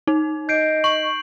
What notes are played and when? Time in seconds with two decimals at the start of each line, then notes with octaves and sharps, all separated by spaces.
0.07 D#4
0.49 D#5 G6 C7 D7
0.84 C#6 F#7